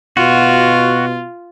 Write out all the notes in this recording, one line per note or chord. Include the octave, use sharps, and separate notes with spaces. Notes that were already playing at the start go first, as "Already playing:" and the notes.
B2 F4 F#4